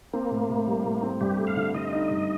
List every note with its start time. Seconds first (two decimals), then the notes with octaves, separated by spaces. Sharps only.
0.13 A#3 C4
0.31 A2
0.50 A2
0.67 G3
0.84 A2
1.03 C4
1.21 G2 G4
1.38 A3
1.47 F5
1.56 D3
1.74 D3 D#5
1.92 D#4
2.10 G2